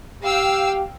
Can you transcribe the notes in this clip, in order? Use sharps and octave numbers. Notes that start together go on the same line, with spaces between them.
G4 F5 G5 E6